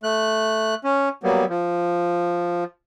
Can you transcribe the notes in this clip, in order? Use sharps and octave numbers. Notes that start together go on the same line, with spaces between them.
A3 F#6
C#4
F#3 G3 A#3 B3
F3